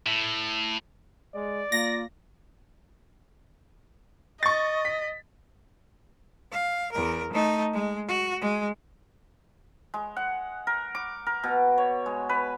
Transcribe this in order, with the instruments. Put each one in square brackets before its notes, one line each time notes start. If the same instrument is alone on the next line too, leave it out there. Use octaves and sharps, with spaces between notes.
[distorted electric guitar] A2
[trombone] G#3 [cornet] D5
[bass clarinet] A#3 [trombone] F4 [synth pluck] A#6
[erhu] D#5 [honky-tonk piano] C#6 A6
[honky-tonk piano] B6
[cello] F5
E2 A#4
A3 D#4
G#3
F#4
G#3
[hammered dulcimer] G#3
F#5
A#4
D6
A#4
B2
C#5
G#3
B4